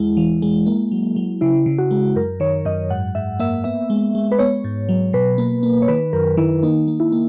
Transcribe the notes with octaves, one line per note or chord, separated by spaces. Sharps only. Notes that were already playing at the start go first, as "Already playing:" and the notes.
Already playing: E2 G#3 E4
E3
G#3
A#3
F#3
F#3
C#3 E4
C#3
F#4
G#3
F#2 A#4
D#3 C#5
F#2 D#5
G#2 F#5
G#2 E5
A#3 E5
B3 E5
G#3
G#3
B4
B3 C#5
G#2
F#3
B2 B4
A#3
A#3
C#5
D#3 B4
F#2 A#4
D#3 E4
A#3 D#4
A#3
E4
A#3